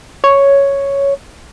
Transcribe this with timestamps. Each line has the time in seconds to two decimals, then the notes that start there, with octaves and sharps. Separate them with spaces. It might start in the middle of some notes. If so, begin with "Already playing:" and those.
0.24 C#5